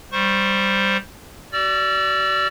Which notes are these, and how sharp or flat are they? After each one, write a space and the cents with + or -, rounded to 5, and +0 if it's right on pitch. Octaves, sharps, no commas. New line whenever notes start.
G3 +0 C5 +0 C#6 -30
F#4 +40 D5 -10 E6 +40